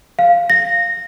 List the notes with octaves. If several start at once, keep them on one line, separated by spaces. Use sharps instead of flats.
F5
A#6